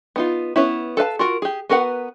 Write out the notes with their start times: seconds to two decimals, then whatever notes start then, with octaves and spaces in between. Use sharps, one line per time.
0.16 B3 D#4 F4
0.56 B3 C#4 E4
0.97 A4 B4 F5 A5
1.19 F4 F#4 A#4
1.42 G4 G#4
1.69 B3 F#4 A#4 B4 F#5